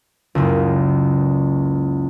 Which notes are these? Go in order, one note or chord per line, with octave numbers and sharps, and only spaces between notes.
F#1 C#2